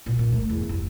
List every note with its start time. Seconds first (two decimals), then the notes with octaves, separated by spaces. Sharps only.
0.06 A#2
0.19 A#2
0.33 A3
0.50 E2
0.69 F1